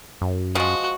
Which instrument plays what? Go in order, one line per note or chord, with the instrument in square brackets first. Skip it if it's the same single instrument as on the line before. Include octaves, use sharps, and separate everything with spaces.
[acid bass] F#2
[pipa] F3 G#3 [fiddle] F#4